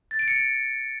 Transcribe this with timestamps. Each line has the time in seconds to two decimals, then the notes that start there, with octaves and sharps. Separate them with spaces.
0.11 A6
0.19 D7
0.28 C#7
0.36 D7